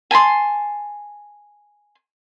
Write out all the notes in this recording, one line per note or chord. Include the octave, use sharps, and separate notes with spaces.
G#5 A5 B5 C6